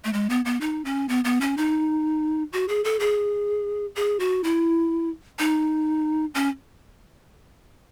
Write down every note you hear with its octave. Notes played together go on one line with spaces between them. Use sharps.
A3
G#3
B3
B3
D#4
C#4
B3
B3
C#4
D#4
F#4
G#4
A4
G#4
G#4
F#4
E4
D#4
C#4